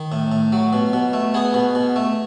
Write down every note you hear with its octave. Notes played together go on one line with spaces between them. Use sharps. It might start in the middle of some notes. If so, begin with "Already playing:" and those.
Already playing: D#3
A2
A2
F#3
B2
B2
A3
B3 G#4
B2
B2
A3